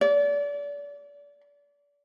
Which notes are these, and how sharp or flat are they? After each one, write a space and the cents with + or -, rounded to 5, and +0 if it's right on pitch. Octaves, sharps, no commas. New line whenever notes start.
D5 -30